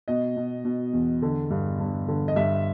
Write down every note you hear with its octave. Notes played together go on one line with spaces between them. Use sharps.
B2 D#5
B2
B2
E2
D3
G2
G2
D3
D#5
G2 E5